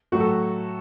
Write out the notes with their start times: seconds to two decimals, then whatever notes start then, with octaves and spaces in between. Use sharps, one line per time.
0.12 A2 F#3 A3 F#4
0.20 A4